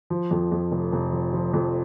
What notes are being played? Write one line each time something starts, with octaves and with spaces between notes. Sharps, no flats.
F3
F2
F2
F1
F1
F3
F3
F2